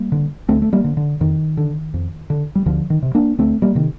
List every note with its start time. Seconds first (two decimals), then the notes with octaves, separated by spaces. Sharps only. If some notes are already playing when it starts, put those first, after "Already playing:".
Already playing: G3 A#3
0.12 D3
0.49 D2 A3 C4
0.62 A3
0.73 G3 A#3
0.84 D3
0.97 D3
1.20 F2 D#3
1.57 D3
1.94 F2
2.30 D3
2.55 G3
2.66 D2 D3 F3
2.90 D#3
3.03 C3
3.15 A#3 D4
3.39 D2 A3 C4
3.62 G3 A#3
3.75 C3 D#3